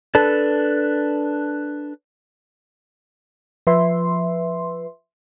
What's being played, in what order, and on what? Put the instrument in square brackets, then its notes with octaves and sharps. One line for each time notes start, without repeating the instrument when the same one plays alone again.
[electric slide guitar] D4 A4 B4
[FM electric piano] F3 B4 E5 C6